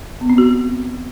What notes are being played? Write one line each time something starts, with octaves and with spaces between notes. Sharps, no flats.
B3
C4
F#4